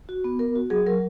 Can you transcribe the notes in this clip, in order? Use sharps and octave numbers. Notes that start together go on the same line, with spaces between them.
F#4
B3
B3 A#4
F#4
F#3 G#4
F#3 A#4